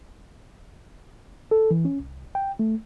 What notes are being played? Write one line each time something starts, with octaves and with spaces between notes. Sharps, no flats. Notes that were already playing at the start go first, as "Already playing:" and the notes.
A4
E3
C#4
C2
G5
A3